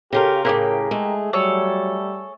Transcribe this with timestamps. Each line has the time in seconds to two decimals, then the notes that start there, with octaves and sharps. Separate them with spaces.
0.13 C#3 F4 G4 A4 A#4
0.45 A2 C#3 A#3 E4 G4 G#4 A#4
0.91 G#3 A3
1.33 F#3 G3 G#4 A4 C#5